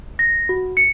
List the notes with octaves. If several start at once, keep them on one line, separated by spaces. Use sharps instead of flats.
A#6
F#4
C#7